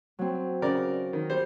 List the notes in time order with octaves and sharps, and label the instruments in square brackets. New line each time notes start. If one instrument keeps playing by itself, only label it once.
[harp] F#3 C4
[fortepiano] C#3 A#4 D5
D#3
G3 C5